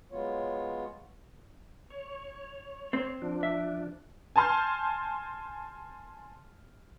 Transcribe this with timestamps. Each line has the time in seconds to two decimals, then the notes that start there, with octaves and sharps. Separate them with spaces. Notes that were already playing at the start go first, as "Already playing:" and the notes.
0.12 F#3 G#3 B3 F4 C#5
1.90 C#5
2.93 C4 C5
3.22 F3 D4
3.43 E5
4.36 G#5 A5 C6 F6 G6